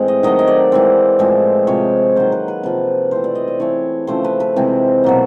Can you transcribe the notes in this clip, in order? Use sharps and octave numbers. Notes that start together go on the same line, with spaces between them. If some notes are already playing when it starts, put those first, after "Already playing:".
Already playing: A2 E3 G#3 C4
D#5
D#3 F#3 A3 C4 D#5
D#5
D5
E3 G#3 C4
A2 F3 G#3 C4
C3 F3 G#3 C#5
D#3 F#3 A#3 C5
B4
B4
C3 F3 A#3 B4
E3 A3 C4 C5
D5
D#5
D5
E3 A3 C4 C#5
C#3 F3 A3 C4 C5
B4
B4
C3 E3 G#3 C4
B2 F#3 A#3